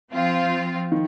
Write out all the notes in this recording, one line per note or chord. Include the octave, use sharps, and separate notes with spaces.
F3 C4 F4
D#3